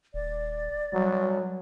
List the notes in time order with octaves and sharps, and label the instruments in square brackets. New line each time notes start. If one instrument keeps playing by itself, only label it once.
[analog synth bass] D#1 [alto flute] D5
[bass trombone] F#3 [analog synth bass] G3